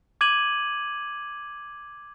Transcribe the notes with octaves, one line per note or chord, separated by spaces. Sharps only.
D6 G#6 D#7 F#7